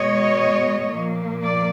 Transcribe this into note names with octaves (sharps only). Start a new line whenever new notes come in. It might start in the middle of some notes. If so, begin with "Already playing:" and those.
Already playing: B2 G#3 B3 C#5 D#5
A#2 F3 A#3
D5